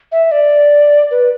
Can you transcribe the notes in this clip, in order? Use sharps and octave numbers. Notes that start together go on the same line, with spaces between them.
E5
D5
B4